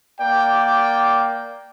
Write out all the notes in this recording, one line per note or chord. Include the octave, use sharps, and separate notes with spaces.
A#3 D5 G5